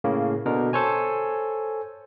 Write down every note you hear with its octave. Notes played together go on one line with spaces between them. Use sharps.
A2 C#3 A#3
B2 D3 A#4
A4 C5 C#5 G#5